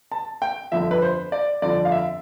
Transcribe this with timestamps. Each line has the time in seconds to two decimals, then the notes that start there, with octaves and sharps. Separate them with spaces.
0.12 A5
0.42 G5
0.72 G1 F2 D3 F3 E5
0.91 B4
1.02 C5
1.32 D5
1.62 G1 F2 D3 F3 D5
1.85 F5
1.92 E5